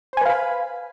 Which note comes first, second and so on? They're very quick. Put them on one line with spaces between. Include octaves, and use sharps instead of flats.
C5 G#5 B4 F5 B5